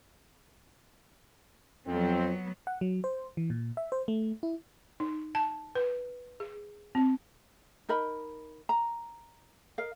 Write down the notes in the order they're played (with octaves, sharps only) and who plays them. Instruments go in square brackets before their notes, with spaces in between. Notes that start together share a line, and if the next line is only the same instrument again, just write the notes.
[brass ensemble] F2 C4 [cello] F#3 B3
[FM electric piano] F#5
F#3
C5
E3
A#2
E5
C5
A3
E4
[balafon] D#4
A5
B4
G#4
C4
[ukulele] D#4 A#4 D#5 B5
A#5
A#4 D#5 F5